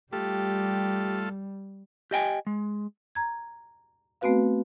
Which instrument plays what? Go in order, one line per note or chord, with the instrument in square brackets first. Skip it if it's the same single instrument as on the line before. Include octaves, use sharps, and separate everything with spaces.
[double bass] G3 [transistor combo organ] A3 F4 A4 [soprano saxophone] G4
[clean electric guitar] G4 D#5 G5 G#5
G#3
[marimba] A#5 G#6
A3 B3 C4 F#4 B4 F5